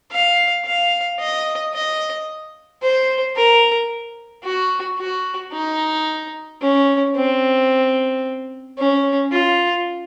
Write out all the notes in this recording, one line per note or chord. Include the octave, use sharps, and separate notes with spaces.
F5
F5
D#5
D#5
C5
A#4
F#4
F#4
D#4
C#4
C4
C#4
F4